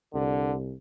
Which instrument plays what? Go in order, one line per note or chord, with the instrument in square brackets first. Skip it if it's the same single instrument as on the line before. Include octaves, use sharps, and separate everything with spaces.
[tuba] C2 [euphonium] D3